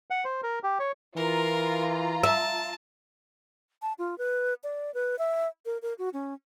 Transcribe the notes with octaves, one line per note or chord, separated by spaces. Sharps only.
F#5
C5
A#4
G4
C#5
E3 F4 A#4 A#5
E5 A5
A5
F4
B4
D5
B4
E5
A#4
A#4
F#4
C#4